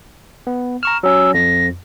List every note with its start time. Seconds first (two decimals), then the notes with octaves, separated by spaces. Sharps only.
0.47 B3
0.83 A#5 C#6 F6 E7
1.03 F#3 C#4 E6
1.34 F2 A#6